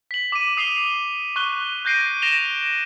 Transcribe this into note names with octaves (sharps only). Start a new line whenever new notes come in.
B6 F#7
D6 D#7
D#6 C7 F7 G7
C#6 F#6 G7
F#6 G6 A#6 C7 D7 D#7
A#6 D7 E7 F7 G7